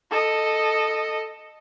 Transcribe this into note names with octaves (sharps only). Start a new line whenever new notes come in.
A4 D#5